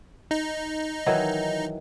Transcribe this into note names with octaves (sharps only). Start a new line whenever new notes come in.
D#4
D#3 E3 F#3